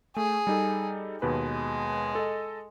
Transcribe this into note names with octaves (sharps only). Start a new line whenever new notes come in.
A3 G#4
G3 D#4 A4
D#2 B2 G#3 B4
A4 D#5